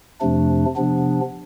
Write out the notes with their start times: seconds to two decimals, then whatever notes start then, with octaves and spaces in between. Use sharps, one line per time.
0.21 F2 C3 F3 A3 D4
0.76 C3 F3 B3 D4